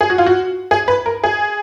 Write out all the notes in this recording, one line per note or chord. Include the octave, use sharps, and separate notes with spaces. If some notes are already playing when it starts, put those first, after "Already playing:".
G#4
F#4
F4
F#4
G#4
B4
A#4
G#4